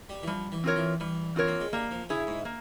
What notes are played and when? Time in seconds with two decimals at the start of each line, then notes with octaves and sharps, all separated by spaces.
0.09 G3
0.23 E3
0.27 F3 G3
0.52 E3
0.64 C4 F4 A#4 C#5
0.76 E3
1.00 E3 G3
1.36 C4 F4 A#4 C#5
1.47 A#3
1.60 G#3
1.73 G3 A#3
1.91 F3
2.09 C#3 E4 G#4
2.27 G#2
2.45 A#3